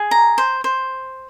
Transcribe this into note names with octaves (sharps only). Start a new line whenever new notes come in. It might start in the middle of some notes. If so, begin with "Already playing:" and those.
Already playing: G#4
A#5
C5
C5